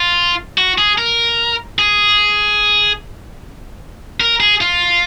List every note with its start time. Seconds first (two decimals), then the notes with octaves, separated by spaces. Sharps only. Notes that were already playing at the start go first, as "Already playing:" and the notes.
Already playing: F4
0.58 F#4
0.78 G#4
0.98 A#4
1.79 G#4
4.20 A#4
4.40 G#4
4.61 F4